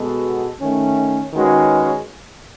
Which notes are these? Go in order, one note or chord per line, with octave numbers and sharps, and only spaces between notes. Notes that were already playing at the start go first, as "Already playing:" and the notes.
Already playing: B2 G#3 B3 F#4 A4
D#3 A3 C#4
D#3 G#3 C#4 F#4 B4